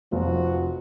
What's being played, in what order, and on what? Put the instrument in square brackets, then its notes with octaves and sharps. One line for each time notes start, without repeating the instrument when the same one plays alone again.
[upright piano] F1 [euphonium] F3 [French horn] F#4